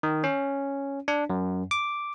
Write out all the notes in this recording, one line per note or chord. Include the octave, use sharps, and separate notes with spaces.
D#3
C#4
D4
F#2
D6